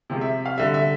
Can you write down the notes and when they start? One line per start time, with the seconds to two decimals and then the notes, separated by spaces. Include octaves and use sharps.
0.10 C3 F3 G#3
0.21 E5
0.46 F5
0.58 D3 G3 E5
0.74 E5